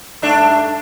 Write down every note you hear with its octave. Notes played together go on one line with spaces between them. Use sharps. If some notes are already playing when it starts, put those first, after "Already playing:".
G2 A3 D4